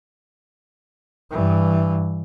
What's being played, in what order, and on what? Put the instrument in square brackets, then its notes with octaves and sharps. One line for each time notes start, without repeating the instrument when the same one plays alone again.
[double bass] G2 E3